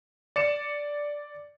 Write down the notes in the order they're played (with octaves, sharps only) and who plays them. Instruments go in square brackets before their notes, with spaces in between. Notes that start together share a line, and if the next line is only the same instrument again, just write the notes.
[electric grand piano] D5 C#7 E7